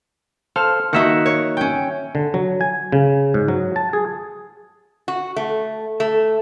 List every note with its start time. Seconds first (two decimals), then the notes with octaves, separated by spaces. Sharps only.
0.56 A4 C5 F5 F6
0.93 D#3 A#3 D#4 F#4 E5 F#5
1.26 C#5
1.57 C#4 G5
2.15 D3
2.34 F#3
2.61 G#5
2.92 C#3
3.34 G#2
3.48 F#3
3.76 A5
3.93 G#4
5.08 F#4
5.36 A3
6.00 A3